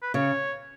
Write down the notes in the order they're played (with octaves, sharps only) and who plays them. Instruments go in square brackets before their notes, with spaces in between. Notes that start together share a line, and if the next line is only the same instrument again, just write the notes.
[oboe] B4
[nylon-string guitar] C#3 [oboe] C#5